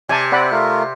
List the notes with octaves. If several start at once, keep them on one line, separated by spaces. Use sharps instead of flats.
C3 D5 G#5 A5
C4 D5 F#5 B5
A3 F4 A#4